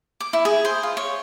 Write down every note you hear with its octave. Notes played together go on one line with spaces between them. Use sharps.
D6
E4
G#4
C5
F4
C#5